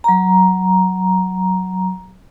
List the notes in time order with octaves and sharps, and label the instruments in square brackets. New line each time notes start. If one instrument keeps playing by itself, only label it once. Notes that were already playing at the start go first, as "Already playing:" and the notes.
[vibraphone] F#3 A#5